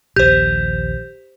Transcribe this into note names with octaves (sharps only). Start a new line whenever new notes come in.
A#1 D#2 G4 C5 G6